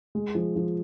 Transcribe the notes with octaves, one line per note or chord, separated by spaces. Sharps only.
G#3
F3
F3